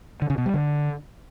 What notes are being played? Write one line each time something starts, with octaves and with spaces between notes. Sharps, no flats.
D3
C#3
B2
G3
D3